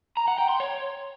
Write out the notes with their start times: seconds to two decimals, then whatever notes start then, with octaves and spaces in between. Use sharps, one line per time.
0.17 A#5
0.28 F#5
0.38 G5
0.49 C6
0.60 C#5